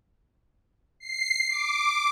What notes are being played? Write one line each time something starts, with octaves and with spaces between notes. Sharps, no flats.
C7
D6